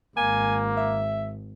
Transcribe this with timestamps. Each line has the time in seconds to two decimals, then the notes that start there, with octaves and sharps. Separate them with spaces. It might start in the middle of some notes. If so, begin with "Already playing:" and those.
0.17 G#1 A#3 G#5
0.77 E5